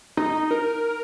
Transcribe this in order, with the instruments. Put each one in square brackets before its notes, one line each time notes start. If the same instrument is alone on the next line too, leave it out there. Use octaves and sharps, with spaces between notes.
[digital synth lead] D#4
A#4